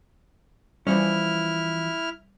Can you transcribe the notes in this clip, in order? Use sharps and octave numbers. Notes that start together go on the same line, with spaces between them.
E3 F3 G3 C#4 E4 F6